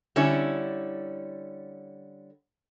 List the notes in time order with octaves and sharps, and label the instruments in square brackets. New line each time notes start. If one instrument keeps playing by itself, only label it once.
[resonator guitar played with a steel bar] D3 G3 C#4 E4